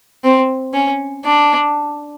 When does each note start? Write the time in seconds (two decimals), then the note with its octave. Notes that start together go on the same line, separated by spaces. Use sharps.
0.24 C4
0.74 C#4
1.25 D4